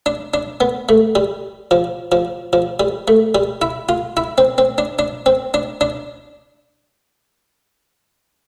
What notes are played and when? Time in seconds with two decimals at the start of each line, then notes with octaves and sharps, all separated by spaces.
0.06 D4
0.34 D4
0.61 B3
0.89 A3
1.15 G3
1.71 F3
2.12 F3
2.53 F3
2.80 G3
3.08 A3
3.35 G3
3.62 E4
3.89 F4
4.17 E4
4.38 C4
4.58 C4
4.78 D4
4.99 D4
5.26 C4
5.54 D4
5.81 D4